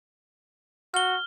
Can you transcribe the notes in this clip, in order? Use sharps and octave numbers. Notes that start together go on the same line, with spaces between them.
F#4 F6 G7